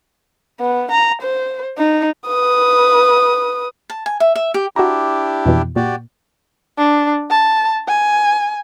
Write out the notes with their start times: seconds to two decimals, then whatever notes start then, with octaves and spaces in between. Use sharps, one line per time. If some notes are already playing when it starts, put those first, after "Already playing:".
0.60 B3
0.91 A#5
1.22 C5
1.78 D#4
2.27 B4 D#6
3.90 A5
4.06 G#5
4.20 E5
4.36 E5
4.54 G4
4.76 D4 E4 F#4 G4 A#5
5.46 F2 B2 E3
5.76 A#2 F#4 G4 D5
6.78 D4
7.30 A5
7.88 G#5